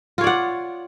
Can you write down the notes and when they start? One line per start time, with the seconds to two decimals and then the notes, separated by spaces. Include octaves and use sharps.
0.18 F4
0.21 C#5
0.24 D5
0.27 F#5